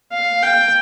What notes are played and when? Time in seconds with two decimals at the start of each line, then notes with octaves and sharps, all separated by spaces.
0.12 F5
0.43 G5